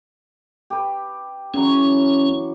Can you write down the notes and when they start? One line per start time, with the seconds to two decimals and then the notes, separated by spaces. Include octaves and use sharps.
0.70 G4 B4
1.54 C#3 E3 F#3 C#4